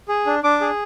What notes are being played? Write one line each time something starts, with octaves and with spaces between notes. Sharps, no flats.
G#4
D4
D4 D6
G#4